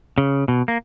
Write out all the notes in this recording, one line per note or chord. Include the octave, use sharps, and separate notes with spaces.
C#3
B2
A#3